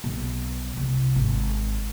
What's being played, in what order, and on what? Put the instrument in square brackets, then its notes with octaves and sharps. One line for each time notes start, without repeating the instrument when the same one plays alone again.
[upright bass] B1
C2
G#1